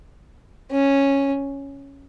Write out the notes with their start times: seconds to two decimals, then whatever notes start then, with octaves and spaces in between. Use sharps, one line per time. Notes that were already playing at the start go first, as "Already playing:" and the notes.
0.71 C#4